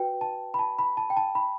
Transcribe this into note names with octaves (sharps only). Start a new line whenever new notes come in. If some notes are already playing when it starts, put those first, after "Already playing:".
Already playing: F#4 B4 G5
A5
B5
A5
B5
A5
G5
A5
B5